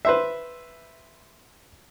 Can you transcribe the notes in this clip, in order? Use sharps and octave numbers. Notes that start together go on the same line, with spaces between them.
B4 C5 E5